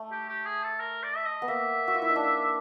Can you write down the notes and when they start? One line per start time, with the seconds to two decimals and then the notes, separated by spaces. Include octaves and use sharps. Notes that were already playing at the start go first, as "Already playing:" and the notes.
Already playing: A3
0.11 G4
0.29 G4
0.46 G#4
0.63 A4
0.80 A#4
1.03 D5
1.16 E5
1.26 D#5
1.42 B3
1.48 A#3 E5
1.88 F#4
1.94 F4
2.02 E4
2.09 D#4
2.16 D4